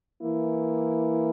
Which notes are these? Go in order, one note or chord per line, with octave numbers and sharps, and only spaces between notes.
E3 A#3 E4